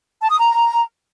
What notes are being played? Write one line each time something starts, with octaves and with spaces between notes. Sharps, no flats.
A5
D#6
A#5